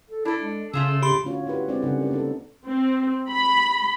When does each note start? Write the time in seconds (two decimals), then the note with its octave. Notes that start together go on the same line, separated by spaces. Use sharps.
0.10 A4
0.25 D4 E4 A4
0.42 G#3
0.73 C#3 A3 F4 G#4 E6
1.02 G4 B5 C6
1.24 D3 A3 C#4 F4 F#4 C#5
1.46 D4 E4 F4 G4 B4 F#5
1.68 G#3 C4 D4 C5 D5
1.82 C#3 G3 D#4 G#4 A4 F#5
1.99 A#4 D5
2.11 A#3 D#4 A4
2.66 C4
3.29 B5